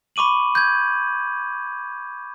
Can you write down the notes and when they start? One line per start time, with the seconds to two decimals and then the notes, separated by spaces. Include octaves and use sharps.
0.16 B5 C#6 D6 D#7 F#7
0.55 G6 G#6